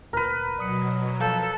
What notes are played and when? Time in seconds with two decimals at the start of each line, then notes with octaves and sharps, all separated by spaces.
0.13 D2 A#2 A#4 B4
0.58 B2 F#3 D5 D#6 C#7
1.20 F3 A4 F5 G6